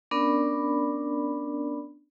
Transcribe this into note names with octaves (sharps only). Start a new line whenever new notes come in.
B3 C#4 D4 A#4 D5 B5